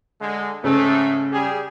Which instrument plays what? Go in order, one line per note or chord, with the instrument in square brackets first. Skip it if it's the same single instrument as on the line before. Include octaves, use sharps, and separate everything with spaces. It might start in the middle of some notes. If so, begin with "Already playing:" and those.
[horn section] D3 G#3
[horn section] G#2 A3 [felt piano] C#3
[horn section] G3 G4 G#4